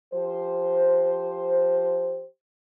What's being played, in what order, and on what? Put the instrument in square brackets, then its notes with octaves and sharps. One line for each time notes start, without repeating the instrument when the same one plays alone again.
[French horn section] F3 G4 C5